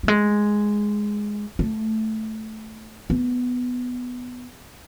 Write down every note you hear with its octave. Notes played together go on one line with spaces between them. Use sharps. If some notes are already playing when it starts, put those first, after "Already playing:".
F#3
G#3
A3
B3